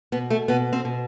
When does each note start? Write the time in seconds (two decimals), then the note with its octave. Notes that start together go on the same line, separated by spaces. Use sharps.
0.12 B2 B3
0.30 A3
0.48 B2 B3
0.73 C4
0.85 B2